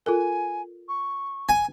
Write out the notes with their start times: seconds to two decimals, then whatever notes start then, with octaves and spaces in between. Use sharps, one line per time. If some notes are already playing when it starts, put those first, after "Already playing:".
0.06 F4 A4 A#4 G#5
0.88 C#6
1.49 G#5